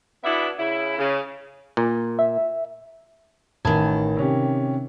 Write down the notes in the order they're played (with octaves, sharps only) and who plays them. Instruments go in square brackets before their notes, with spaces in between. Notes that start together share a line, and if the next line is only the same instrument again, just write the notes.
[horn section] B2 B3 D4 E4 E5
C#3 E4
C#3
[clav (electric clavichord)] A#2
[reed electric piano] E5
[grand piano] A1 A5 B5 [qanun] D#3 G#5
[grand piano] C3 C#4 G4